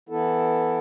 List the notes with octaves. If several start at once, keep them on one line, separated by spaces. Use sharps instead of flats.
E3 B3 E4 A4